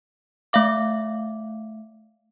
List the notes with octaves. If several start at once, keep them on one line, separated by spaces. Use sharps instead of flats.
A3 E5 F5 D6